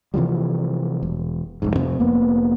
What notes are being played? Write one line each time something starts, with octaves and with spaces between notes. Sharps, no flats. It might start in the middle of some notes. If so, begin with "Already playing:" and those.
C3 E3 F3 G3
E1
F1 C2 G#2
F2 C3 F3 C4
F1 A#3 B3